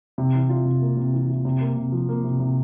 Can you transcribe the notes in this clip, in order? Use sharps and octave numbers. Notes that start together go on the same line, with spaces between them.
C3
E3
F4
C3
A#3
C3
E3
F4
C3
A#3
C3
F3
A#3
C3
C3